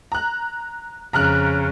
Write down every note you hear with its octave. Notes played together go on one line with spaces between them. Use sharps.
A#5 F#6
F2 C#3 A#5 F6 F#6